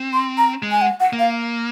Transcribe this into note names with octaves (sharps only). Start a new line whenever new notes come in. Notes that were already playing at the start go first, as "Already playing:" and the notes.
Already playing: C4
C6
A#5
G#3
G#5
F#5
F#5
A#3
F5